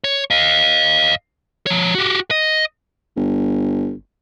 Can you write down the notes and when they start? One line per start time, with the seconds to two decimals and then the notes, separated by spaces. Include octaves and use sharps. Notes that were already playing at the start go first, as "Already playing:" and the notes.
0.04 C#5
0.31 D#5 F5
1.66 F3 C#5
1.95 F#4 G4
2.31 D#5
3.16 G1